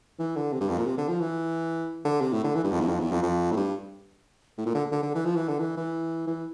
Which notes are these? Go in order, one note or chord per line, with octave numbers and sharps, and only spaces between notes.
E3
D3
C3
G2
F2
A#2
C3
D3
F3
E3
D3
C3
A2
D3
E3
G2
F2
E2
F2
E2
F2
F2
A2
G2
A2
A#2
D3
D3
D3
E3
F3
E3
D3
E3
E3
E3